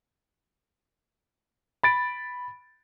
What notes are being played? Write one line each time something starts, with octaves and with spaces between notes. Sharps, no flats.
B5 A6 D7